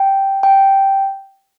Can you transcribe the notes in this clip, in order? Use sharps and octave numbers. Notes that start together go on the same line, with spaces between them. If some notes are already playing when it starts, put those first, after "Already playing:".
Already playing: G5
G5